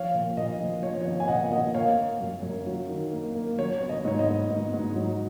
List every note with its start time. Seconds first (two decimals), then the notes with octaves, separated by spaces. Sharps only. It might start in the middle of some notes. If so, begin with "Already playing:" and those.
Already playing: F3 C#5 F5
0.14 A#2
0.37 A#2 D#5
0.59 F3
0.83 F3 C#5
1.02 C#5
1.06 B3 D#5
1.20 G#5
1.28 A#2 D#5 F#5
1.51 A#2 D#5 F#5
1.74 A#3 C#5 F5
1.97 A#3
2.20 F#2
2.43 F#2
2.66 F#3
2.89 D#3
3.12 A#3
3.35 A#3
3.58 F#3 C#5
3.78 B3 C#5
3.89 D#5
4.05 G#2 C#5
4.19 D#5
4.27 B3
4.50 G#2
4.73 G#2
4.96 F#3